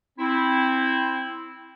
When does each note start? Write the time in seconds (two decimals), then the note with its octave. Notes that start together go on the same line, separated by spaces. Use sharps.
0.19 C4 E4